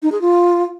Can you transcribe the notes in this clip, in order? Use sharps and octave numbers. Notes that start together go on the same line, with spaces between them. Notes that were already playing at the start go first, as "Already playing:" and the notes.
D#4
G#4
F4